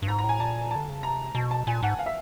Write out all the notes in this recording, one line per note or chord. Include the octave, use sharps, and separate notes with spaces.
G2
G#2 A#5
A#5
A2
G#5
A#2 A5
D3 A5
C#3
C3 A#5
B2 A5
A5
A#2 G#5
G#2 F#5
F5
E5